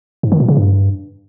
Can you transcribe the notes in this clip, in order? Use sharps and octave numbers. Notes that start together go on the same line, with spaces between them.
G#2
D#3
A#2
C#3
G2